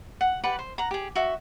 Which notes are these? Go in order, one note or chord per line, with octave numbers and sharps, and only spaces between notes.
F#5
G4 B4 D5 F#5
C5
F#5 A#5
G4 G#4
F#4 E5